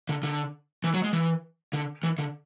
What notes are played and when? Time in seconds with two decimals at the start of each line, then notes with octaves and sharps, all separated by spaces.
0.09 D3
0.23 D3
0.84 E3
0.94 F#3
1.04 G#3
1.13 E3
1.73 D3
2.03 E3
2.18 D3